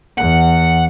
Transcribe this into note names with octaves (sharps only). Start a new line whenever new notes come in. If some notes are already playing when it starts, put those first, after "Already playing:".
E2 F#5